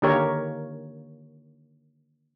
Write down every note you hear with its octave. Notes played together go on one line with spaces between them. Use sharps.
D3 D#3 A#3 G4 A#4 C#5